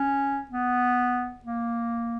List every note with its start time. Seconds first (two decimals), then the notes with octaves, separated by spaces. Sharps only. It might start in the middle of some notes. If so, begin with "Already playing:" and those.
Already playing: C#4
0.51 B3
1.45 A#3